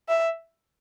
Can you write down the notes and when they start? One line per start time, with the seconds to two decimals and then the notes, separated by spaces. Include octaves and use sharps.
0.09 E5